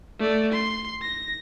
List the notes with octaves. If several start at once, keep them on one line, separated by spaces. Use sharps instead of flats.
A3 D5
C6
A#6